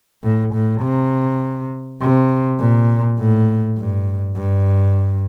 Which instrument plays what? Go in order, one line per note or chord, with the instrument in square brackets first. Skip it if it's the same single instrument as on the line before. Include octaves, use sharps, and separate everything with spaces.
[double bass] A2
A2
C3
C3
A#2
A2
G2
G2